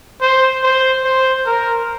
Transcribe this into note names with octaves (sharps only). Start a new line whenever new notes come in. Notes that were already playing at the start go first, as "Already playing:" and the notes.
C5
C5
C5
A#4